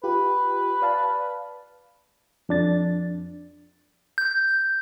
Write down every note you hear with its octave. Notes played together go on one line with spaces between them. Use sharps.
F4 G4 B4
D5 F5 A5
F2 D4 A6
G6